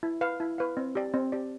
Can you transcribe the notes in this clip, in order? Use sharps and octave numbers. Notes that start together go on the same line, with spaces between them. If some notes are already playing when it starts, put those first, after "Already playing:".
E4
B4 F5
E4
B4 F5
C4
G4 D5
C4
G4 D5